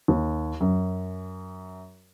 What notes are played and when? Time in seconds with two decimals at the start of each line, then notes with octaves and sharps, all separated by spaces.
0.08 D#2
0.60 F#2